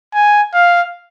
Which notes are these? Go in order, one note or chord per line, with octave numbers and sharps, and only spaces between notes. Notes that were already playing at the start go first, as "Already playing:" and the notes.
G#5
F5